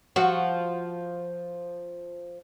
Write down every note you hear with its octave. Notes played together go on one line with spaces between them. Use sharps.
F3 F#4